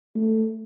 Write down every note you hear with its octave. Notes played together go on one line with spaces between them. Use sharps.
A3